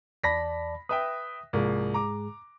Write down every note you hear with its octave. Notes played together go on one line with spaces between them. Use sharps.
E2 D5 A5 B5 A#6 B6
B4 E5 G5 D#6
C2 G#2 F3 G#3 A#3 G#4
A#5 D6